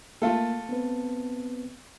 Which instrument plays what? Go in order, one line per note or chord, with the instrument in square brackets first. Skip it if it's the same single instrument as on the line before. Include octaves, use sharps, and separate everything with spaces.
[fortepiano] A3 F4 A4 [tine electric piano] A#3
[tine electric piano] B3 C4 B4